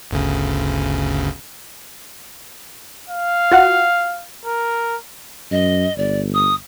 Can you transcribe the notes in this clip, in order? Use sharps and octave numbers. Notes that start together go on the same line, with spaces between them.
G1 D2 C#3
F5
F4 F#4 F#5
A#4
F#2 D#5
G1 D5
D#6